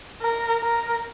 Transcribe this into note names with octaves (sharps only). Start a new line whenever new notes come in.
A#4
A#4